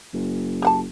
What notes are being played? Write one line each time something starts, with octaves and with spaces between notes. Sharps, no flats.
F#1
G4 F#5 A5